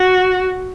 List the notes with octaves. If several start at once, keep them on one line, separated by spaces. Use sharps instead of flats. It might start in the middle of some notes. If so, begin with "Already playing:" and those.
Already playing: F#4